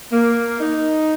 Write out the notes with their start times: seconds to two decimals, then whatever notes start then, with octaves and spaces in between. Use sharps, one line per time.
0.11 A#3
0.60 D#4